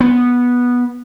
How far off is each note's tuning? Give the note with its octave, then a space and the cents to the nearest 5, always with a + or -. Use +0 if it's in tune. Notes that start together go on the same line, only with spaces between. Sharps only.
B3 -10